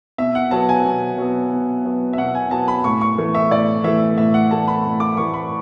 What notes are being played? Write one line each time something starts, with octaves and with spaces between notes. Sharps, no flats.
B2 E5
F#5
F#3 B3 A5
G#5
B2
F#3 B3
B2
F#3 B3
E5
B2 F#5
G#5
F#3 B3 A5
B5
A2 C#6
C#6
E3 A3
E5
A2 D5
E3 A3 E5
A2 E5
F#5
E3 A3 A5
B5
A2
D6
E3 A3 C#6
B5